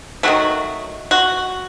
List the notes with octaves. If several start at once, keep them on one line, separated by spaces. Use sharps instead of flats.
D#3 F#3 A3 F#4
F#4